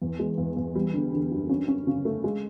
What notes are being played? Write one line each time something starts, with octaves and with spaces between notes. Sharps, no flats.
E2
G#3
E2
E2
G3
D3
D3
F#2
C#4
C#4
C#3
A3
G#3